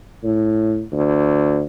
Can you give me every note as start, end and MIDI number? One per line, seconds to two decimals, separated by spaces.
0.23 0.82 45
0.92 1.62 38